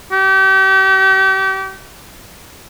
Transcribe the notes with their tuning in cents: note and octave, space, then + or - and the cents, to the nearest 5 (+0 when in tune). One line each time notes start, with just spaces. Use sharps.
G4 -35